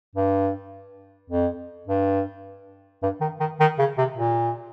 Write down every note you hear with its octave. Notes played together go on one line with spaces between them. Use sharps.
G2
F2
G2
G2
D#3
D#3
D#3
C#3
C3
A#2